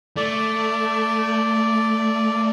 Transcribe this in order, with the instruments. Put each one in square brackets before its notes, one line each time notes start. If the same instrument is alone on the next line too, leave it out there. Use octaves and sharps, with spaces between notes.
[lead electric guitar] A3 [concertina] D5